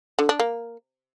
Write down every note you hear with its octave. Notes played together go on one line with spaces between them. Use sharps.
D3
D4
A#3